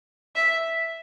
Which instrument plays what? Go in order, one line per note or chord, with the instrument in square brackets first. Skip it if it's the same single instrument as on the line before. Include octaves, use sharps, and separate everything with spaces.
[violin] E5